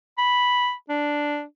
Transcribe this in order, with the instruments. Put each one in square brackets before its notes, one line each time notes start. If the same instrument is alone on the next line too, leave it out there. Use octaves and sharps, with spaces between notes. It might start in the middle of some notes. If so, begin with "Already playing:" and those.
[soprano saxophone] B5
D4